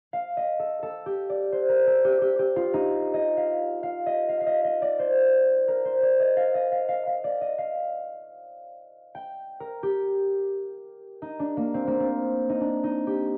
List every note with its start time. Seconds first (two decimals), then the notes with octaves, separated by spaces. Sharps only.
0.13 F5
0.37 D#5
0.59 A4
0.83 A4
1.06 G4
1.29 D5
1.52 C5
1.69 A#4
1.87 A4
2.04 G4
2.21 G4
2.39 G4
2.56 F4
2.74 D#4
3.14 D#5
3.37 F5
3.83 F5
4.06 D#5
4.29 F5
4.41 F5
4.47 D#5
4.64 D#5
4.82 D5
4.99 C5
5.68 A#4
5.85 C5
6.02 D5
6.20 D#5
6.36 F5
6.55 D#5
6.72 F5
6.89 F5
7.07 F5
7.24 D5
7.41 D#5
7.58 F5
9.15 G5
9.60 A#4
9.83 G4
11.22 D#4
11.39 D4
11.57 A#3
11.74 C4
11.87 A#3
12.00 C4
12.49 D#4
12.61 D4
12.84 D#4
13.07 G4